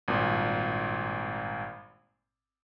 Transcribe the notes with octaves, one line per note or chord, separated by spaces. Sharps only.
G#1 G2 A#2